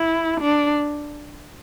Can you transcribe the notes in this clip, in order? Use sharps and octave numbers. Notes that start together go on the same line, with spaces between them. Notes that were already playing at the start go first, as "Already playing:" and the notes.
Already playing: E4
D4